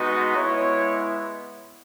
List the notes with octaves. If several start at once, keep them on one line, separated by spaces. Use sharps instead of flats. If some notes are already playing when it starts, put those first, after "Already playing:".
Already playing: G#3 B3 D#4 F#4
G#3 B3 E4 C#5